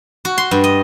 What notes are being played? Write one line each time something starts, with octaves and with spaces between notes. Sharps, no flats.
F#4
C6
G2
D#5